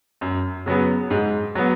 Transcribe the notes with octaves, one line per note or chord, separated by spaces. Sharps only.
F#2
C#3 F#3 B3
G#2
F#3 B3